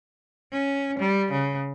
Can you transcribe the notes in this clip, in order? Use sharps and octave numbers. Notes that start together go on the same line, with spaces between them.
C#4
G3
C#3